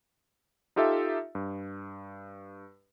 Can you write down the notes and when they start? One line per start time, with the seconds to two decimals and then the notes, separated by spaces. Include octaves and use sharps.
0.76 D#4 F4 G4 A4 E5
1.35 G2